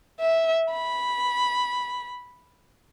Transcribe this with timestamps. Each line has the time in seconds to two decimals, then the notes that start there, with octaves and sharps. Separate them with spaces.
0.20 E5
0.70 B5